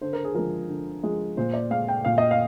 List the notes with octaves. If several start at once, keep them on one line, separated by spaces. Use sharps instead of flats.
D3 C5
A#4
G#4
F3 G#3 A#4
D3
F3 G#3
A#2 C5
D5
G#3 F5
G5
A#2 F5
D#5
F5